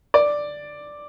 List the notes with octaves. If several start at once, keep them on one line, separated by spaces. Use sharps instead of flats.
D5